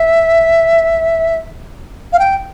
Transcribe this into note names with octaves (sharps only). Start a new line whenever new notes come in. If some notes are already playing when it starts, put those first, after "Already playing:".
Already playing: E5
F5
G5